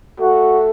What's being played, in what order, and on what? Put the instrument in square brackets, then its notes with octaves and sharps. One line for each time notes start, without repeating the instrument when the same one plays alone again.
[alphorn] A3 [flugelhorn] F#4